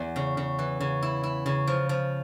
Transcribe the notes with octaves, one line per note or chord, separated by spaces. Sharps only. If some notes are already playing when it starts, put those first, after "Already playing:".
Already playing: E2
C#3
C#3
E3
C#3
E4
E4
C#3
F3
F3